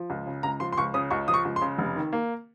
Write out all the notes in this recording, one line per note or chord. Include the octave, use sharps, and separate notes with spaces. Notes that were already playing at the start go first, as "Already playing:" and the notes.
Already playing: F3
C#2
C#3
C#2 A#5
F3 C6
C6
C#2 C#6
C#3 D#6
C#2 C#6
F3 D#6
C#6
C#2
C6
C#3
F1
D#3
A#3